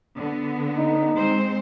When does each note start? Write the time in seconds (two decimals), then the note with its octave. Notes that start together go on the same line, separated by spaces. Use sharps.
0.17 D3 B3
0.78 D#4
1.16 G#3 C4 C5